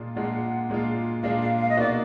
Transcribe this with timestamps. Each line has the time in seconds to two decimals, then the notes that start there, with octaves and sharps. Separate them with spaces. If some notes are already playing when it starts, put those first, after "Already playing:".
Already playing: A#2 G#3 D4 F4
0.16 A#2 G#3 D4 F4 F#5
0.70 A#2 G#3 D4 F4
1.23 A#2 G#3 D4 F4 F5
1.42 F5
1.59 F5
1.69 D#5
1.77 B2 A#3 D#4 F#4 D5